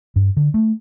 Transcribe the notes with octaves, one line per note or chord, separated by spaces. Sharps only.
G2
D3
A3